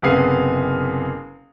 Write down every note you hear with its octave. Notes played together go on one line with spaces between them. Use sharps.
F#1 C3 B3 G#4 F5 C7